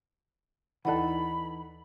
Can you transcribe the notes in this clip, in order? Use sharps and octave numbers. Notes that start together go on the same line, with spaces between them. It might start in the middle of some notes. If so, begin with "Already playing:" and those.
D#2 E3 D#4 A4 D5 F#5 B5